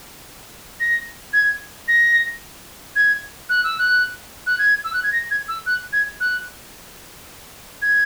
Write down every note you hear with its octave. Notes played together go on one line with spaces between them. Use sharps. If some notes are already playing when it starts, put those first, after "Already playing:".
A#6
G#6
A#6
G#6
F#6
E6
F#6
F#6
G#6
E6
F#6
G#6
A#6
G#6
E6
F#6
G#6
F#6
G#6